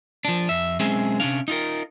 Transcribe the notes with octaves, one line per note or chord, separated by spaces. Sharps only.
F3 D4
F2 E5
B1 G#3 C4 C#4 G#4 E5
C3 C#4 D4 F5
D#4 F4 A#4